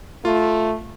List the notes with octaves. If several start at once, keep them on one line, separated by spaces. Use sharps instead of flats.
A3 F4